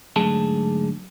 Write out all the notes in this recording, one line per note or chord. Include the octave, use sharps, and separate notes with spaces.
G#2 D3 F#3 A3 G#4 A5